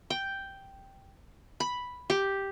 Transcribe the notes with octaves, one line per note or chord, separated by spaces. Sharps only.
G5
B5
G4